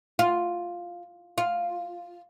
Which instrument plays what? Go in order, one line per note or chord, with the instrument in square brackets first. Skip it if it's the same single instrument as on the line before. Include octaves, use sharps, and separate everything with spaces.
[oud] F4
F4